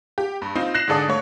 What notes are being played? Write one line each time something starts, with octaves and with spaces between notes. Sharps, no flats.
G4
G2
C4 D#4 F4
F#6 A#6 C7 E7
G#2 D3 G#4 A4 D5 D#6
G#1 A3 C#5